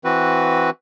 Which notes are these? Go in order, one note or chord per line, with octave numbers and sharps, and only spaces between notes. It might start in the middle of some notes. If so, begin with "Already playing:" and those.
E3 C4 F#4 B4